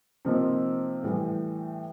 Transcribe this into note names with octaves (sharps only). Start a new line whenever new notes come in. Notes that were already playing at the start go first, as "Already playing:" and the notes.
C3 F3 A#3 D#4
A2 E3 G3